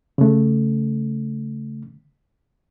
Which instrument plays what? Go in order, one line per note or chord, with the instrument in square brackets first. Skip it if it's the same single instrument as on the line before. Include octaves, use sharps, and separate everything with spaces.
[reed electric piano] C#3 A3